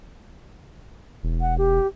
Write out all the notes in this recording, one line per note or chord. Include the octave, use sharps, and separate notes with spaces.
E1
F#5
G4